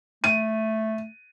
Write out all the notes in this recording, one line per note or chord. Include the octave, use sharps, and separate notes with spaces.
A3 D#7